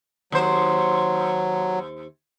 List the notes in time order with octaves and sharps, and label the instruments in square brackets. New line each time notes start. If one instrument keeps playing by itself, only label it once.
[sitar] D#2 C5 [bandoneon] F#3